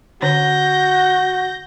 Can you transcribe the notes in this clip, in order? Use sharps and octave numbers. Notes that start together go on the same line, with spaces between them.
D3 C#4 F#4 C#5 G6 A#6